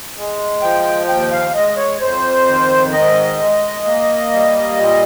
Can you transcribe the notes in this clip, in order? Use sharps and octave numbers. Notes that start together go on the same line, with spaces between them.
G#3
F3 G5
D#2 G5
F5
G#3 D#5
C#5
F2 C5
D#3
G#2 D#5
G#3
A#3
G3
A#2